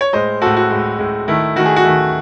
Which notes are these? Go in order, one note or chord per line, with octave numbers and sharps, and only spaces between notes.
C#5
A2 G#3 C5 D#5
A2 G#3 F#4 A4
F#4
A2 G#3
A2 G#3
D#3 A3 E4
D#3 A3 F#4
G#4
F#4
D#3 A3